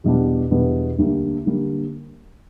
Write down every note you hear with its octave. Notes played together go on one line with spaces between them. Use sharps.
E2 B2 G3 B3 D4
E2 B2 G3 B3 D4
D2 D3 G3 A#3
D3 G3 A#3